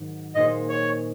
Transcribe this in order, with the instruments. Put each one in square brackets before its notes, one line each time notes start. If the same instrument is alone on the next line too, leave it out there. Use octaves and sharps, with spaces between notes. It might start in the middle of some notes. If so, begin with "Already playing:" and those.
Already playing: [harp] G#2 D#3 F#3
[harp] A#2 G#3 D#4 G#4 C5 [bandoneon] D#5
[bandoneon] C#5